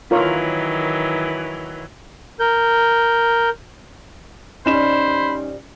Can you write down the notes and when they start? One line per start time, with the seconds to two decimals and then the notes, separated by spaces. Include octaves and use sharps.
0.11 D#3 E3 F#3 F4 A#4 C#5
2.40 A#4 G6
4.66 A#2 G3 C4 C#4 D#4 C5 B5 E7